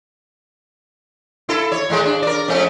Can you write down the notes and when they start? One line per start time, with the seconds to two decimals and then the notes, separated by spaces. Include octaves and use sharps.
1.49 E4 A4
1.72 C#5
1.90 A2 G#3 A3
2.05 D4
2.23 A#4 D5
2.48 F2 A3 C#4